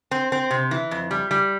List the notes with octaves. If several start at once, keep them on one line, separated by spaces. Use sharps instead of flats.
C4
C4
C3
E3
F2
G3
G3